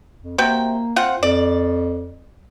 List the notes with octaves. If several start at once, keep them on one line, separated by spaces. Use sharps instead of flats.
F2
C3 A#3 F#4 G5
C4 F4 F#5
F2 D5